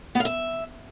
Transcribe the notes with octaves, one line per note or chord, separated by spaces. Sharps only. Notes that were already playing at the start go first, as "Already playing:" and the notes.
B3
F5
E5